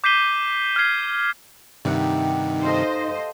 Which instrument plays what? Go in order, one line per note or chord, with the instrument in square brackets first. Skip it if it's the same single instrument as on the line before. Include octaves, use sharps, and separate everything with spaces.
[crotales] D6 G6 B6 C7 D#7 G7
F6 G6 G#6 C7
[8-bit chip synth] G2 C3 D#3 [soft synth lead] D#4 [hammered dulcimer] G4 E5 F#5
[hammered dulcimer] A4 F5 [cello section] C5 D#5